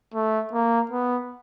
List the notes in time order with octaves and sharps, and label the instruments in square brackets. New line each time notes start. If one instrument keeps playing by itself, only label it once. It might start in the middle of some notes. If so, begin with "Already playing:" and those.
[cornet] A3
A#3
B3